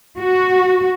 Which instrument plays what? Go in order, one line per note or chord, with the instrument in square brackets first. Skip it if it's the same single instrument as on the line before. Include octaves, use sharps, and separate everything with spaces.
[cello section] F#4